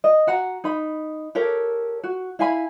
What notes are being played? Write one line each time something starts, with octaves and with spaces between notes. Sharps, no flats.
D#5
F#4 F#5 A#5
D#4 B5
G4 A4 A#4 C#5
F#4
E4 F5 G#5 B5